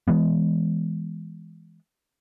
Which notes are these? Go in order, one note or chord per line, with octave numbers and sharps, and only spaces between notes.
E3 G#3 B3